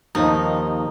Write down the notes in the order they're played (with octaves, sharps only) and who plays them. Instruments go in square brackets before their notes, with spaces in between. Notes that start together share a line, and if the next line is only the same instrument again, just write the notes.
[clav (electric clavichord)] D#2 F3 [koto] D#4